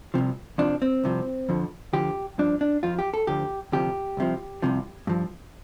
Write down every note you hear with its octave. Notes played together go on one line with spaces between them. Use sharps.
C2 C3 F3
F2 C3 F3 D4
C4
C2 C3 F3
F2 D3 F3
D2 D3 F3 G4
G2 F3 D4
D4
F2 F3 F4
G4
A4
D2 D3 F3 G4
D2 C3 F3 G4
C2 C3 F3
C2 C3 F3
G2 F3